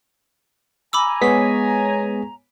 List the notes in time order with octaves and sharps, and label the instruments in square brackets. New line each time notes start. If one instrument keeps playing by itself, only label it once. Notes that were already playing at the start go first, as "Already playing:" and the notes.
[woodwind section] G#5 A#5 [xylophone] B5 D6 E6
[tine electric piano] G#3 G#4 B6 [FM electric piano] B3 C#5